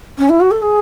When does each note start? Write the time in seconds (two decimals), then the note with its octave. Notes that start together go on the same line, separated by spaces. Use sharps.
0.18 C#4
0.29 E4
0.40 F#4
0.51 A4
0.62 G#4